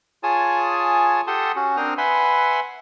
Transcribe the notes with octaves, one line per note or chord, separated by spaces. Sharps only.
F4 G#4 C#5 G#5 A5 D#6
G4 A4 F#5 A5 C6 D#6
C#4 F#4
C4 D4 A#4 C5 D#6 F6
B4 E5 F#5 G#5 B5 C6